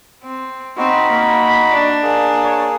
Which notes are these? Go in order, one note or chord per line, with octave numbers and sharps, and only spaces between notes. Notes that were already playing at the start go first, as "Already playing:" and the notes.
C4
C4 D#4 F#4 B5
A#3
D4
A#3 G#4
C#5